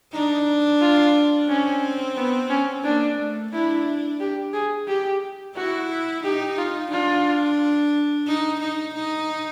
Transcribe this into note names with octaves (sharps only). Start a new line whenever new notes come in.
D4 D#4
F4
C4 C#4
B3
C#4
A#3 D4
A3
D4 E4
G4
G#4
G4
E4 F#4
D#4 G4
F4
D4 F4
D#4
D#4
D#4